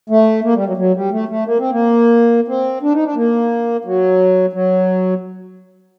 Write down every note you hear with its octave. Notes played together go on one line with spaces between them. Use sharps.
A3
A#3
G3
F#3
F#3
G3
A3
A3
A#3
C4
A#3
C4
D4
D#4
D4
A#3
F#3
F#3